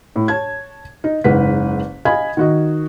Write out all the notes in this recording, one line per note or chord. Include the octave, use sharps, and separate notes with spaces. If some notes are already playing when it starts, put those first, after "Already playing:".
A2
C#5 A5 G#6
D#4
F#1 G#2 B4 F#5 B6
D#5 F5 G#5 B5 G#6
D#3 F#4 D#5